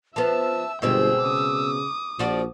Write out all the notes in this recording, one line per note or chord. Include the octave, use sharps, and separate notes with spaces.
F3 B3 E5 A5 E6
G1 B2 G#3 C4 G#4 G5 E6
C#3 D6 D#6
A#1 F3 F#4 D5